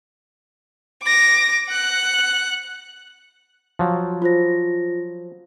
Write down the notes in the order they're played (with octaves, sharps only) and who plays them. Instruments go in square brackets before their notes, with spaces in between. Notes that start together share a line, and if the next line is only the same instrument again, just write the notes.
[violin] D6 A#6
F#5 F#6
[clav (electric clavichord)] F3 F#3
[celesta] F4 C5 A#6